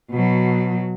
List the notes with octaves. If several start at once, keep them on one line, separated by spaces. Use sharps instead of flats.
B2 F#3